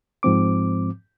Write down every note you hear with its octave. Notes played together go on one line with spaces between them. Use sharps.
G#2 F3 C4 D6